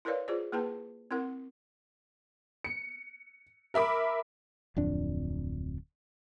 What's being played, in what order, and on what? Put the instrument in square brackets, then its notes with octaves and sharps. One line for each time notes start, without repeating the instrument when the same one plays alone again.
[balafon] E4 A#4 B4 C#5 D5 F5
F4 G#4 C5 D5
A#3 E4 G#4 B4 G5 A5
C4 E4 A#4 F#5
[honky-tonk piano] C#7
A#4 E5 B5 D6
[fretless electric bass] D1 F2 D4